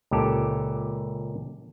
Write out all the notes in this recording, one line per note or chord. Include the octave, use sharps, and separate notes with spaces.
C#2 A#2 G4 A4